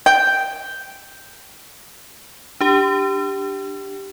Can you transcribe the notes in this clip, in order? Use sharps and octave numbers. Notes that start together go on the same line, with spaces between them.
G5
D4 G4